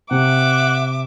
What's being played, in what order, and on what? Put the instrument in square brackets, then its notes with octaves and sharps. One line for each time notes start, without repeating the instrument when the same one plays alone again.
[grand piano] C3 [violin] E5 D6 [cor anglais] F#5